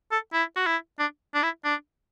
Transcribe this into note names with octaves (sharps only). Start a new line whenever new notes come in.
A4
E4
F#4
E4
D4
D4
E4
D4